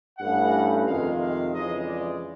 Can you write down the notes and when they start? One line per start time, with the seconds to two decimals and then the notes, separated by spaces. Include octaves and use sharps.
0.19 G2 E3 A3 C#4 F#5
0.86 F2 C3 D#3 G#3 F5
1.19 F5
1.51 F2 C#3 E3 G#3 D#5
1.85 D5